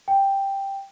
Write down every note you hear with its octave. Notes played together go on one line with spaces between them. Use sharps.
G5